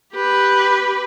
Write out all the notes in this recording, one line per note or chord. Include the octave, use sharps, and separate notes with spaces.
G4 B4